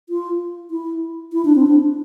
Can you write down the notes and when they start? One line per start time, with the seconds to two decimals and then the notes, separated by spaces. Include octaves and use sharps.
0.09 F4
0.71 E4
1.33 E4
1.45 D4
1.55 C4
1.67 D4